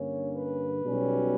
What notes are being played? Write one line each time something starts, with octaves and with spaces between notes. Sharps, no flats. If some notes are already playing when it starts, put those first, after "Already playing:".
Already playing: G2 D3 A#3 C#4 C#5
B4
B1 B2 G3 C#4